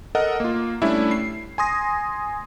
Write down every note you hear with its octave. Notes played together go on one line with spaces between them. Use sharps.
A4 A#4 D#5 F#5
A#3 F4
G3 A3 C#4 D4 E4 E5
C7
G#5 C6 D#6 A#6